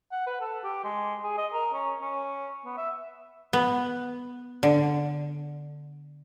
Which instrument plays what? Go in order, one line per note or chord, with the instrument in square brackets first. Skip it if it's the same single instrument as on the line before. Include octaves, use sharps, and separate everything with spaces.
[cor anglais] F#5
B4
A4
G4
G#3
G#4
D#5
A#4
C#4
C#4
B3
E5
[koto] B3
D3